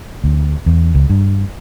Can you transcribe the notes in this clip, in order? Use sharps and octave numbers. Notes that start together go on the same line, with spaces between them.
D2
E2
C#2
G2